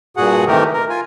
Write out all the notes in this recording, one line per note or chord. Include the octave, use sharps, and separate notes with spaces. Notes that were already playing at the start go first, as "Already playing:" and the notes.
G2 A#2 F#4 G#4 F#5
C3 D#3 E3 A3 G4 A#4
A#4
F4 G#5